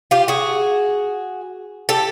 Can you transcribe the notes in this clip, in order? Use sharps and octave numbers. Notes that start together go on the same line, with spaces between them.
F4 G4
F#4 G#4
G4 A4